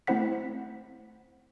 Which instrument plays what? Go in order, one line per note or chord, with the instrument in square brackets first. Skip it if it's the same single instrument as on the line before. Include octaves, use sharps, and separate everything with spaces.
[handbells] A3 C4 E4 C5 F#5 B6